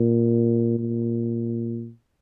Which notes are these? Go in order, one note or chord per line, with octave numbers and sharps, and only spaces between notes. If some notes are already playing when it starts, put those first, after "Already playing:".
Already playing: A#2
A#2